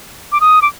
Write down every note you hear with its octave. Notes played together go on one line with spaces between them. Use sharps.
D6
D#6
D6